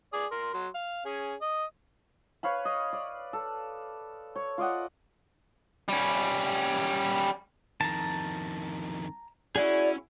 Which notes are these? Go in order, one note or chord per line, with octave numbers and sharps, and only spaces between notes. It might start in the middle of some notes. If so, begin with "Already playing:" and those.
G#4 D5 D#6
A#4 C6
F#3 C6
F5
C#4 G#4
D#5
B4 C#5 F5 B5
D#5
D5
A4
C#5
F4 D5 D#5 F#5
G3 C#4
F2 D#3 A5 A#5
C#4 E4 F#4 G#4 D5